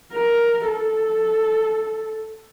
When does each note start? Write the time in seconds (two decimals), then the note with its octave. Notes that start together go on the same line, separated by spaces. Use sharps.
0.13 A#4
0.66 A4